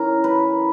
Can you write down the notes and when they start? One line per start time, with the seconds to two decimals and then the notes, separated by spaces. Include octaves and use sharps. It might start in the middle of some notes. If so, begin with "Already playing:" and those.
Already playing: E3 C#4 A#4
0.24 B4